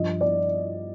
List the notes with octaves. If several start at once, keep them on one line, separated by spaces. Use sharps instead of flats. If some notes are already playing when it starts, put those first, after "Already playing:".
Already playing: G2 F3 D#5
D5